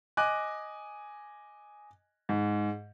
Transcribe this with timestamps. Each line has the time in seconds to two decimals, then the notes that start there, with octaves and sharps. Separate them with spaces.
0.17 D#5 G#5 D6 F#6
2.29 G#2